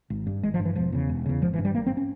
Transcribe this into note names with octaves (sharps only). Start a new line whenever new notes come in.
G#1
G2
G#1 G#3
F3
G2
E3
E1 F3
E2 C#3
E1
E2 C#3
G#1 F3
E3
G2
G3
G#1 A#3
C4
C#4